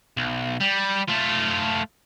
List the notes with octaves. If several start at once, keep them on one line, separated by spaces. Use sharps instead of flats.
B1
G3
A3 F4